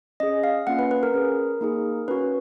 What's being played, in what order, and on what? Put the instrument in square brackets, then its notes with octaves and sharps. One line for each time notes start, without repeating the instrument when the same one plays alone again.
[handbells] C#4 G#4 D#5
F5
A#3 C#4 F4 F#5
B4
B4
A#4
C#4 G#4
A#3 D#4 G#4
C#4 F#4 B4